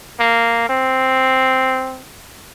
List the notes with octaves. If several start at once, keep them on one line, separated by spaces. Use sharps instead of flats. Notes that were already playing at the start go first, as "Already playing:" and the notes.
A#3
C4